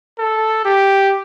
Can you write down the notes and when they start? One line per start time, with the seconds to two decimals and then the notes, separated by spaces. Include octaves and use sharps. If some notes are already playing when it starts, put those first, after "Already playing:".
0.19 A4
0.65 G4